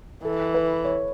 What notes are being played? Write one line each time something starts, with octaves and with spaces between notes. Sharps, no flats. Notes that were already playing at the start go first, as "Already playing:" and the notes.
E3 A4
B4
C#5